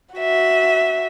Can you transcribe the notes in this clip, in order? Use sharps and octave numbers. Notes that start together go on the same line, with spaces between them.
F#4 E5